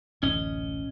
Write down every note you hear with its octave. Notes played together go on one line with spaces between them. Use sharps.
D1 A1 C#4 D#5